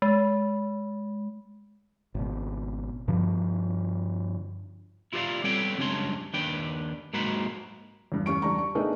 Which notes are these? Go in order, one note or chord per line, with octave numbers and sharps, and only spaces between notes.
G#3
G#1 B2
G2 D3 F3
E4 F4 G4 A#4 D5 F5
G3 B3 C4 A4 C#5 G5
C#2 F#2 G3 D4 C#5 C6
D#2 D4 B4 G5
G#2 F#3 A#3 F#4 C5 B5
E2 G2
E2 G3 C#4 C#6 D7
E2 G3 D4 A#5 C#6
C#6
A3 B3 D4 D#4 G#4 A#4